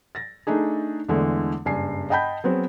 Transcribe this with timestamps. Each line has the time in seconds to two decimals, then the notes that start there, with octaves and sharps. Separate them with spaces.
0.15 A6 A#6
0.47 A3 D4 D#4 G#4
1.09 E2 D3 E3 G#3 A3
1.65 F#1 G2 G#5 C7
2.10 D#5 F#5 G5 A5 B5 G6
2.44 F#3 B3 C4 G#4 C5